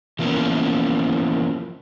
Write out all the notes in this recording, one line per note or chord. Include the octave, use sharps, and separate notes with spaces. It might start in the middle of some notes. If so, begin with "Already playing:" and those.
E3 F3 A#3 B3 C#4 E4